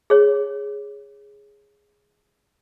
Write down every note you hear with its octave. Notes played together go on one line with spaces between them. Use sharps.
G#4 C#5